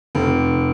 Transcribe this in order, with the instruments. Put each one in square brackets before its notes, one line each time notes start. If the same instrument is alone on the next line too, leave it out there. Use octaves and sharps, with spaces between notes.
[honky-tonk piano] F1